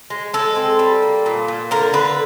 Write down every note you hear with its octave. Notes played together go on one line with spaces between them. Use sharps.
G#3
G#3 A4
C4
G3
A#3
A#2
A#2
D3 A#4
D3 B4